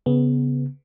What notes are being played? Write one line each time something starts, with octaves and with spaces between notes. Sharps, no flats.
C#3 B3